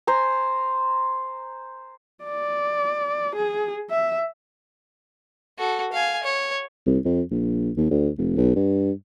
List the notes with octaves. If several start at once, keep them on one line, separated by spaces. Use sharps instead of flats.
C5 G#5 A#5
D5
G#4
E5
F#4 A4
F5 G#5
C#5
C2
F2
A#1
D#2
D2
F1
B1
G2